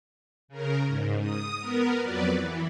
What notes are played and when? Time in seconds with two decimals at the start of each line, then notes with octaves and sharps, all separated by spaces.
0.48 C#3 A#4
0.87 G#2
1.20 D#6
1.60 B3 A#4
2.02 F2 F#3 B4 D5
2.36 E3